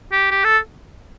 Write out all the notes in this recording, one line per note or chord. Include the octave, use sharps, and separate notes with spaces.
G4
G4
A4